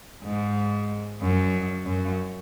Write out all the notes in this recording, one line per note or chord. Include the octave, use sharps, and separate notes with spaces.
G#2
F#2
F#2